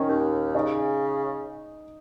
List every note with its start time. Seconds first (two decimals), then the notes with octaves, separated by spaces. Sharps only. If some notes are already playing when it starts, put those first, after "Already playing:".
Already playing: D#3 C#4
0.08 D#2
0.54 C#3 D#4